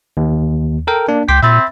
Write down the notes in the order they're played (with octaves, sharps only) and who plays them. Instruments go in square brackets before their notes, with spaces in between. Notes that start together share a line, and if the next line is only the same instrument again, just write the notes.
[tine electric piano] D#2
A4 A#4 G5
A#3 D4
[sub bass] C#2 [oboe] G5 [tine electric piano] C6 D6 B6
[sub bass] A#2 [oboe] C4 [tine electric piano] E5 B5 A6